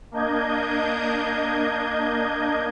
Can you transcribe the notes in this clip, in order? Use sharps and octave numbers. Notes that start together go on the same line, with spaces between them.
A#3 D4 D#5 G6 G#6